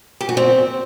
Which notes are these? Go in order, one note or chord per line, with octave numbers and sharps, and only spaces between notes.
G4
F#4
C4